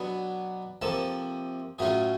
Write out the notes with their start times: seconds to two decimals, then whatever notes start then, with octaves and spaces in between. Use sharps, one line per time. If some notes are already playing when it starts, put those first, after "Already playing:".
Already playing: B2 F#3 B3 D4
0.81 C3 F3 A#3 A4 A5
1.79 A2 F#3 A3 C#4 F4 G#4 G#5